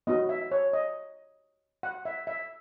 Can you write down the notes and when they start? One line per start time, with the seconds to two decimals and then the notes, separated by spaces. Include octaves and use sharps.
0.07 B3 D#4 F#4 D#5
0.29 E5
0.51 C#5
0.73 D#5
1.83 F#5
2.05 E5
2.27 E5